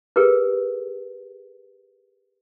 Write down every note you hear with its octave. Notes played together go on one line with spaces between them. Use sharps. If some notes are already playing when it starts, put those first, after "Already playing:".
G4 G#4 A#4 B4